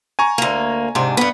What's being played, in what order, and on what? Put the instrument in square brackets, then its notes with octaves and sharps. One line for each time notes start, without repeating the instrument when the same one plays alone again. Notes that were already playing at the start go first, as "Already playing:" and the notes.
[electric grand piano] G#5 A#5 C#6
[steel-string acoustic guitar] D2 A#3
G#2 C3 D4
G2 B3